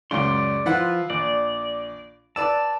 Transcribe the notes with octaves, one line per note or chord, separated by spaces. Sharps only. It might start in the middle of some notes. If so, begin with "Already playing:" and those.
C#2 F#2 C#3 D5 C6
F3 E4 F4 B4 F#5
A#1 D5
B4 D5 A5 E6